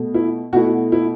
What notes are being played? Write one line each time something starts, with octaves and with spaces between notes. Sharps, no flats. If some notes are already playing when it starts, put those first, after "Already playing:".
Already playing: B2 A3
E4
B2 A3 E4 F#4
E4